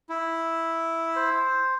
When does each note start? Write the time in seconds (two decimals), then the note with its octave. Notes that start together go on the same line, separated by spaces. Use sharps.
0.09 E4
1.16 C5